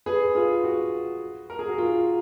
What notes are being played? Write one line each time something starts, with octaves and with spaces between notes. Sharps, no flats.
G#4 B4
F4 G#4
F#4
A#4
G#4
F#4
F4